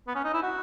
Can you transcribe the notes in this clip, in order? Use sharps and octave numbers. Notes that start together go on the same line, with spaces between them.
B3
C#4
D#4
E4
F#4